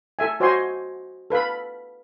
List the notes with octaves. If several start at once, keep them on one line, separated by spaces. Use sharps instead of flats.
A4 E5 G#5
F#4 C5 C#5 D#5 G#5 C6
A4 B4 F5 B5